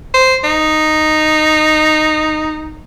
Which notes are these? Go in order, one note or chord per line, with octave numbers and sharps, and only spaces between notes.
C5
D#4